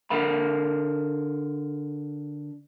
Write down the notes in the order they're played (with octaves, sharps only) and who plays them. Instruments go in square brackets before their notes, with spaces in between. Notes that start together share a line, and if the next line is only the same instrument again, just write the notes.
[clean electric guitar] D3 A#4 F5 B5